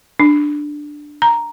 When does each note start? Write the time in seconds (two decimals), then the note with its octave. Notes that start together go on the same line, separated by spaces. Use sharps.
0.19 D4
1.22 A#5